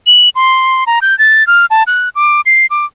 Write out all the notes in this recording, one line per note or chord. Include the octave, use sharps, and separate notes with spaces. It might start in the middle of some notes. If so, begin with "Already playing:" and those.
F#7
C6
A#5
G6
A6
F6
A5
F#6
D6
C7
D6